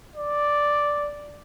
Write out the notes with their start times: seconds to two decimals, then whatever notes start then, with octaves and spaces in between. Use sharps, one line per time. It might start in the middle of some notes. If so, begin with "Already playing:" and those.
0.16 D5